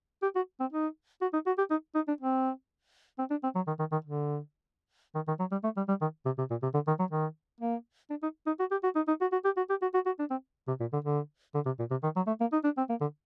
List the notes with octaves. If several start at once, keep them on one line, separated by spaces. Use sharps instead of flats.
G4
F#4
C4
D#4
F#4
D#4
F#4
G4
D#4
D#4
D4
C4
C4
D4
C4
F#3
D#3
D#3
D#3
D3
D#3
D#3
F#3
G3
A3
G3
G3
D#3
C3
C3
A#2
C3
D3
D#3
F#3
D#3
A#3
D4
D#4
D#4
F#4
G4
F#4
D#4
D#4
F#4
F#4
G4
F#4
G4
F#4
F#4
F#4
D4
C4
C3
A#2
D3
D3
D3
C3
A#2
C3
D#3
F#3
A3
A#3
D#4
D4
C4
A#3
D3